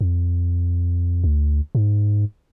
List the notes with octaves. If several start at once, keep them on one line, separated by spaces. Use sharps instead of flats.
F2
D2
G#2